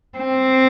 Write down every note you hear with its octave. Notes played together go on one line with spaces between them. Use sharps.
C4